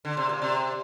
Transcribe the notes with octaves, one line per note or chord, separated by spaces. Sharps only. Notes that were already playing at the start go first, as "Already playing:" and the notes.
D3
C3
A#2
C3